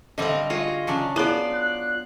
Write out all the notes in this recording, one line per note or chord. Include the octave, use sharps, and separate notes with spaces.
D3 G3 C4 D#5 F5
F4 F#4 G#4 D#5
C#3 F#3 D4
B3 E4 F4 G#4 D5
F#6